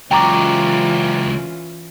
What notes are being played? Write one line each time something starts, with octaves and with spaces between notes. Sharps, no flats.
C#2 E3 F#3 C#4 F4 G5 A#5 D6